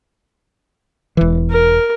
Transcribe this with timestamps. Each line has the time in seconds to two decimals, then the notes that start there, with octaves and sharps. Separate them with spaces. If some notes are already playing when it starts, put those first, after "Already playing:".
1.17 E1 E3
1.50 A#4